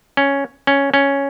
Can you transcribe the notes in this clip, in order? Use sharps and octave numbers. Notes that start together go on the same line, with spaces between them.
C#4
C#4
C#4